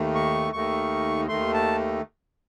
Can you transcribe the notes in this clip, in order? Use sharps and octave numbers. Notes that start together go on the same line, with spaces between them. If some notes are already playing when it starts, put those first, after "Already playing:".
Already playing: D#2 D#3 A3
C#6
D#2 D#3 A3 C#6
D#2 D#3 A3 C6
A5